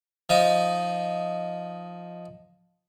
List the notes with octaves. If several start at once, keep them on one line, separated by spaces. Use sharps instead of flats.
F3 D#4